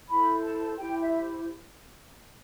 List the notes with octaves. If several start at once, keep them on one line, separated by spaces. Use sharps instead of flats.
E4 A4 C5 B5
A5
E4 G4 C5 G5
E5